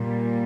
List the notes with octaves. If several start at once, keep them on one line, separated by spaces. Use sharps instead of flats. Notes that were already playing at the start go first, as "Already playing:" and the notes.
Already playing: A#2 G3